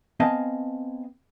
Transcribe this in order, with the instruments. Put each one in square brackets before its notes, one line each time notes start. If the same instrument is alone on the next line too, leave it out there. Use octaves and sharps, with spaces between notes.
[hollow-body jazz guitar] B3 C4 D#5 F5 G#5 A5